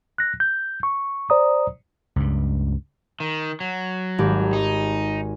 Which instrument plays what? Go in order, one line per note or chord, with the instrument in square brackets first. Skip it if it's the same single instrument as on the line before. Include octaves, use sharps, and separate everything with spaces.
[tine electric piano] F#6 A#6
G6
C#6
C5 D5 A#5 D#6
[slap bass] C#2 G2
[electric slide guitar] D#3
F#3
[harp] G#1 G4
[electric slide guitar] D#4 [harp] G#5